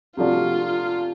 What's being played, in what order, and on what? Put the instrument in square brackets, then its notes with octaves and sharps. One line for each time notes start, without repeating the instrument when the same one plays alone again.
[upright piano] C3 F3 A3 D4 F#4 [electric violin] F4